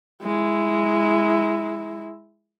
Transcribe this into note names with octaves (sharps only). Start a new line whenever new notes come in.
G#3 E4